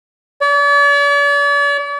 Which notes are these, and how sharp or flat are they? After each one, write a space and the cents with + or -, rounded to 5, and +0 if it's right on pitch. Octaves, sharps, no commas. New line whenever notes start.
D5 -45